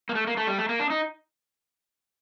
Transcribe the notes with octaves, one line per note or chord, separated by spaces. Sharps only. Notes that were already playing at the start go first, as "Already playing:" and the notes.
A#3
A3
A#3
A3
G3
A3
A#3
D4
D#4